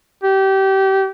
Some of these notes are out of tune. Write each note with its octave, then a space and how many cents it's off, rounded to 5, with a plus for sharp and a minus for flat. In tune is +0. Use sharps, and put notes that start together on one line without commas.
G4 -25